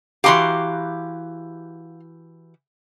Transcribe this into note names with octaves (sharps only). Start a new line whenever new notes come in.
E3 F#4 G4 F5 A#5 C6